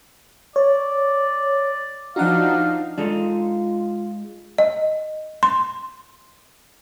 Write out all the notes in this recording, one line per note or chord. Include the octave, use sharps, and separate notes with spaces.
C#5 D5
F3 D4 D#4 F#4 F5 F#5
G#3 D4 D#4 F4 A4
D#5
C6